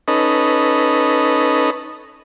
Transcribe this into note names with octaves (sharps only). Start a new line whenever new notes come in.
C#4 D#4 A4 B4 D#5